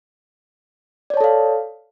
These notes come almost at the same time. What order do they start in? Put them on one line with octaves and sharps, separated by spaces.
D5 C#5 A5 A4 F5